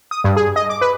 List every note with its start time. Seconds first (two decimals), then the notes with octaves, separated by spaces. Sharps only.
0.11 D#6
0.24 G2
0.36 G#4
0.56 D#5
0.69 D6
0.81 B4